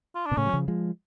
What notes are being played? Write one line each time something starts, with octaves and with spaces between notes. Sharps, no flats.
F4
D4
B2
A2 C#3 C#4
F#3
C#3 F3
F3 G#3